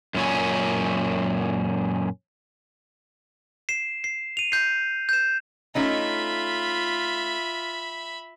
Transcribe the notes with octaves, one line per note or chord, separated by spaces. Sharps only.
F#2 A#2 C#4
C7 E7
C7
D#7 F7
G6 C7
G6 E7
A3 C#4 D#4 F4 E5 B5